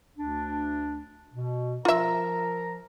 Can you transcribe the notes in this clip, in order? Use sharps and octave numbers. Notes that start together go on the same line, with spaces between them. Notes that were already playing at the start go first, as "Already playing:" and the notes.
D2 D4
B2
F3 F4 A#4 E5 A#5